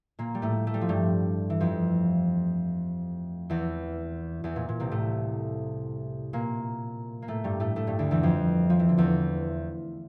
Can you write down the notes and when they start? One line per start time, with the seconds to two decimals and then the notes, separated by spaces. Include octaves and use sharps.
0.19 A#2 A#3
0.35 G3
0.42 A2 A3
0.67 A3
0.74 G3
0.81 F3
0.89 G2 G3
1.50 E3
1.60 F2 F3
3.50 E2 E3
4.44 E2 E3
4.56 A#2
4.69 A#2
4.80 C2 C3
4.91 A2 A3
6.33 A#2 A#3
7.22 A#3
7.28 A2 A3
7.44 G2 G3
7.60 A2 A3
7.76 A2 A3
7.87 G2 G3
7.99 D2 D3
8.11 E2 E3
8.23 F2 F3
8.70 F3
8.79 E3
8.89 D3
8.97 E2 E3